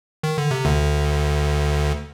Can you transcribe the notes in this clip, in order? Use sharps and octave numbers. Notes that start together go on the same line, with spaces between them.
D#3
D3
C3
D2 D3